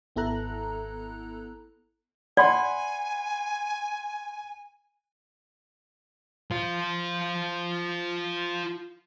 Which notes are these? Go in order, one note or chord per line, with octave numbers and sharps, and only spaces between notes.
G#1 B3 E4 A4 A#5 F#6
D5 F#5 G#5 B5 C6
F4 C5